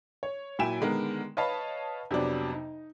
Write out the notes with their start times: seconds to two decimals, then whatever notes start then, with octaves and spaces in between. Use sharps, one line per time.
0.23 C#5
0.59 A#2 F#3 E4 G5 G#5 E7
0.80 D3 D#3 G#3 B3 A#4
1.37 B4 C#5 D#5 F5 A5 B5
2.11 F2 C3 F#3 B3 D4
2.53 D#4